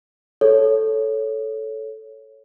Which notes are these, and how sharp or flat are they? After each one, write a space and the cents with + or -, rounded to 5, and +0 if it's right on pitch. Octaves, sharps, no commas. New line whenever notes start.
A4 -5 C#5 +0